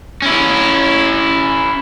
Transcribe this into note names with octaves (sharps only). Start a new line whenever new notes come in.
C#4 E4